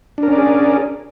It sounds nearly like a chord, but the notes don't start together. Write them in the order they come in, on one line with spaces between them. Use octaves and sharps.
D4 A#4 C#4 D5 G#4